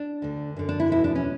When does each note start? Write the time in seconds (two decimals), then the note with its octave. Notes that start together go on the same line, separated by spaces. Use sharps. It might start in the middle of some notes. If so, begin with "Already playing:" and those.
Already playing: D4
0.22 D2 D3
0.56 F#2 D3
0.69 D4
0.80 E4
0.92 E2 B2 E4
1.04 D4
1.15 C#4